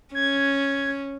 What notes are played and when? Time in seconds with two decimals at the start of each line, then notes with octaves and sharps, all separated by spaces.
0.15 C#4 G#6